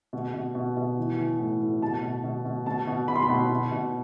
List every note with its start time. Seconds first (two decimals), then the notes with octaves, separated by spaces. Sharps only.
0.13 B2
0.34 B2
0.55 B2
0.77 B2
0.98 E3
1.19 E3
1.39 A2
1.61 A2
1.82 B2 A5
2.03 B2
2.24 B2
2.45 B2
2.66 B2 A5
2.87 B2
3.08 B2 B5
3.16 C6
3.22 B5
3.29 B2
3.50 B2
3.72 B2